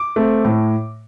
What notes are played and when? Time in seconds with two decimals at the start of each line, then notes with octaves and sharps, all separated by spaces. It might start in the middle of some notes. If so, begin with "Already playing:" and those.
Already playing: D6
0.16 A3 C4
0.45 A2